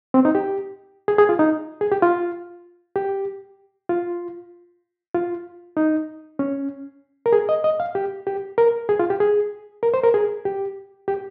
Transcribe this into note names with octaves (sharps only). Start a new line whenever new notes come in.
C4
D#4
G4
G#4
G#4
F4
D#4
G#4
G4
F4
G4
F4
F4
D#4
C#4
A#4
G#4
D#5
D#5
F5
G4
G4
A#4
G#4
F4
G4
G#4
A#4
C5
A#4
G#4
G4
G4